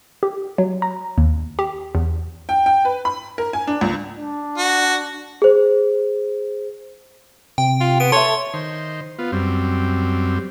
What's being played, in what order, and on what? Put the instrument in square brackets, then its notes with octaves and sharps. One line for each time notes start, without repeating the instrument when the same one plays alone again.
[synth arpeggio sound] G4
F#3
A#5
D#2
G4
E2
[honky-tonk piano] G5
G5
B4
B5
A#4
G#5
D4
C#2
[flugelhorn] D4
[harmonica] F#4
[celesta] G#4 C5
[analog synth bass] C3 [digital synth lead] G5
[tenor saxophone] F4
[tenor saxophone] B3 [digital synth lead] D7
[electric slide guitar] A4 E5 [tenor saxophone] C#5 [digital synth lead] C6
[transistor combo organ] D#3 C5
B3 F4
F#2 G3 C4